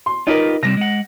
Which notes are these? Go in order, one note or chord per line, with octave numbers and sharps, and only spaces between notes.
C6
D#4 F4 G4 A#4 B4
C3 G3 C4 A#6
G#3 F#5